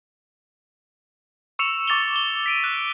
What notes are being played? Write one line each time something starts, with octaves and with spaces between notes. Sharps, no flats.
C#6 E6 C#7 E7 F7
C#6 D6 A6 E7 F7 G7
G7
B6 D7 D#7
D6 F#6